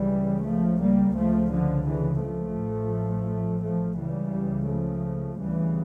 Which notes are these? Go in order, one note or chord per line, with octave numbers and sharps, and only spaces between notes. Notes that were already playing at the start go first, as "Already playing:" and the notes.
Already playing: C#2 C#3 E3 G3
F3 A3
G3 A#3
C#2 C#3 F3 A3
D3 F3
C#3 E3
F3 A3
A1 A2
F3 A3
C#2 C#3 E3 G3
F3 A3
D2 C#3 E3 G3